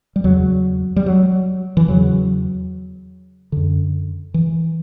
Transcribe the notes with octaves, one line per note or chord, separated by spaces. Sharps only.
G3
E2 C#3 F#3
G3
F#3
E3
E2 C#3 F#3
F#2 D3
E3